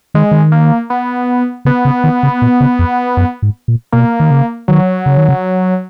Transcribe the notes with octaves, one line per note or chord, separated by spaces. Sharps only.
D#3 G#3
D#3
A#3
B3
C#3 B3
C#3
D#3
C#3
A#2
C#3
F2
F#2
G#2
A#2
B2 A#3
D#3
C#3
D#3 F#3
C#3
D#3
C#3